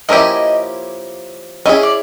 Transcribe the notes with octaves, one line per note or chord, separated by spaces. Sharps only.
F3 A#3 C#4 E4 G4 D#5
C#4 E4 G#4 D#5
D5